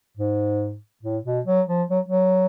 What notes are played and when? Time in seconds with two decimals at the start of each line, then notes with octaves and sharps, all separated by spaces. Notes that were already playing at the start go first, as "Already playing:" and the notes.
0.17 G#2
1.03 A2
1.25 B2
1.46 F#3
1.68 F3
1.90 F#3
2.08 F#3